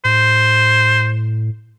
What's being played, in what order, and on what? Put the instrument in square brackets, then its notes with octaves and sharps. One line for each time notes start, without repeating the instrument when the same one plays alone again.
[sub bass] A2 [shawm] C5